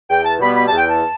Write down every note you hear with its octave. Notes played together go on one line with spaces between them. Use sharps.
E2 G5
A5
B2 G3 B3 B5
B5
A5
E2
G5
A5